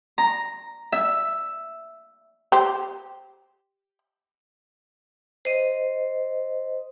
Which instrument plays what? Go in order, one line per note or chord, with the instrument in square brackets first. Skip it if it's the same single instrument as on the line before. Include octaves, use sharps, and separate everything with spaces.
[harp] A#5
E5
[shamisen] G4 C5
[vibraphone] C5 D#5